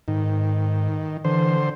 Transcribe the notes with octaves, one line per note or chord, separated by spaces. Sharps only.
G#2 D#3
D3 E3 C5